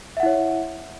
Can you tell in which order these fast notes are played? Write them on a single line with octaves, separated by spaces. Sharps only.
E5 F#5 E4 C#5